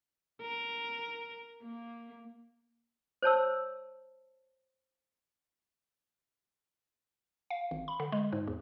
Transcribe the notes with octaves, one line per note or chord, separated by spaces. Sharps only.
A#4
A#3
C5 C#5 A5 E6
F5
G#1
B5
D3
G#3
G#2
E2